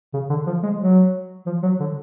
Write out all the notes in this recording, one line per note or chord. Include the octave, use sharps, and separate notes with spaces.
C#3
D3
F3
G#3
F#3
F3
F#3
D3